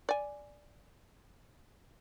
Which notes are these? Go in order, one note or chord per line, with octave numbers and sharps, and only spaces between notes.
D5 G#5